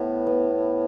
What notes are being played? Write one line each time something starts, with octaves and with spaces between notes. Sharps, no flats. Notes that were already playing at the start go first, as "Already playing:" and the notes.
Already playing: A2 B3
B3